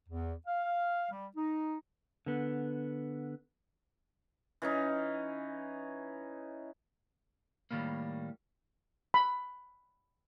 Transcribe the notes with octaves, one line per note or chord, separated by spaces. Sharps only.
E2
F5
G3
D#4
D3 B3
E3 C#4 D#4
A2 D#3 F3 G3 A#3
B5